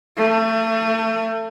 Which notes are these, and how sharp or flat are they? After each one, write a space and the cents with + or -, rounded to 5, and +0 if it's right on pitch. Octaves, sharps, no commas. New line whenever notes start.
A3 +35